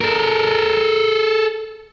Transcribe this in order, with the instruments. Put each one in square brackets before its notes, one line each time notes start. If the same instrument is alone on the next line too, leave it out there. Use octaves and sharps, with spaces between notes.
[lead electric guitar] A4 A#4